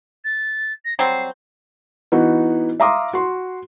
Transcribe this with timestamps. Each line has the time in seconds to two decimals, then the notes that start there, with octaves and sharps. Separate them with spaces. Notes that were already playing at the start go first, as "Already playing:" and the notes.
0.24 A6
0.85 A#6
0.99 F#3 G3 C4 C7
2.12 E3 B3 D#4 F#4
2.80 E5 F5 A#5 C6 D6 D#6
3.13 F#4 C6